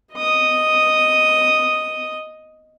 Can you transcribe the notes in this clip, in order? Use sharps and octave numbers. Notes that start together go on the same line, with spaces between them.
D#5 D#6